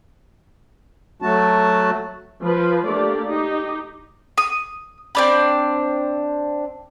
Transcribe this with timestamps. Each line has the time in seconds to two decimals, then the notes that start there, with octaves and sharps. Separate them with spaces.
1.22 F#3 A3 F#4 A5
2.41 F3 B4
2.86 A3 A#3 D4 G4 D5
3.26 D#4 G4
4.37 D#6
5.15 C4 D4 B5